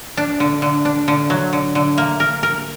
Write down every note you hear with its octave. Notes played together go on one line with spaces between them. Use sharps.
D4
D3
D3
D4
D3
F#3
D3
D3
A#3
A#4
A#4